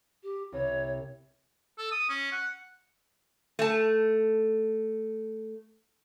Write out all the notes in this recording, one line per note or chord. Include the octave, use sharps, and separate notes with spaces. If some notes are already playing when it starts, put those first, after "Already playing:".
G4
C2 C#5
A4
D#6
C#4
F#5
A3 A5